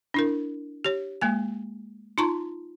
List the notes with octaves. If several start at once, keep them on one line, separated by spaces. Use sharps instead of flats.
D4 E4 A#4
G4 C#5
G#3 A#3 G#5
D#4 F4 A5 A#5 C6 C#6